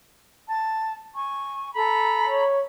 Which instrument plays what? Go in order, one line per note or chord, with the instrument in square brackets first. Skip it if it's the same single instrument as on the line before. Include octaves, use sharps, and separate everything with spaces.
[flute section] A5
G#5 C#6
A4 A#5 B5
[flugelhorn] C#5